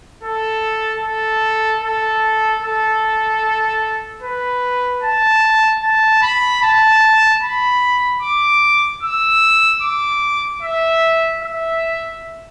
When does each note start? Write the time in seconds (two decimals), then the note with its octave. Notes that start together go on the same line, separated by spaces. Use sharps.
0.23 A4
1.03 A4
1.83 A4
2.62 A4
4.22 B4
5.03 A5
5.83 A5
6.22 B5
6.63 A5
7.42 B5
8.22 D6
9.03 E6
9.82 D6
10.63 E5
11.42 E5